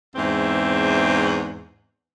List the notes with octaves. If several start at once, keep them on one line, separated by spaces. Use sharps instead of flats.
E2 G#2 C4 E5